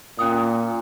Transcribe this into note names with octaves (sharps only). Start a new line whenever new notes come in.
A#2 C#4 G5 D#6